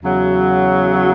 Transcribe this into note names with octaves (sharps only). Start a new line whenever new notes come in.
E2 C#3 F#3